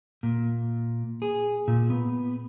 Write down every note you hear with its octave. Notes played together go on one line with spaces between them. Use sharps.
A#2
G#4
A#2
B3